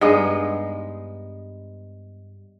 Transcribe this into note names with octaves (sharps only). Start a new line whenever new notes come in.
G2 G#3 B3 D#4